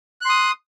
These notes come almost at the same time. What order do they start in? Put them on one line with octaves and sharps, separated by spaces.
F#6 C6 D#6